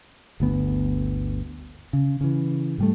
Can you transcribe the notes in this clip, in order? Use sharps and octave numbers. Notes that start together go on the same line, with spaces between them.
G1 D2 B3
C#3
C#3 E3
G#2 G3 A3